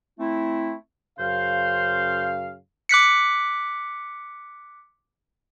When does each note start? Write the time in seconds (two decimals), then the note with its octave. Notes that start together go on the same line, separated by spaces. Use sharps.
0.20 A3 C4 E4
1.19 F#2 C#3 C5 F5
2.89 D6 F#6 B6 C#7